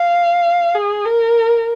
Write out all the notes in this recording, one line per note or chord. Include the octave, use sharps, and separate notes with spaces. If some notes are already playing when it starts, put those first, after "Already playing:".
Already playing: F5
G#4
A#4